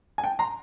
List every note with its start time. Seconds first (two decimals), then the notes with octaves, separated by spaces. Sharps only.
0.18 G#5
0.24 G5 A5
0.39 A#5 C6